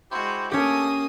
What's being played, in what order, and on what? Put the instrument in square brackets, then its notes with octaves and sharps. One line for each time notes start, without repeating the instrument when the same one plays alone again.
[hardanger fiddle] G#3 F#4 [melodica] E4 G4 C5
[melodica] A3 [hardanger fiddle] A#3 D#6 [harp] C#4 G4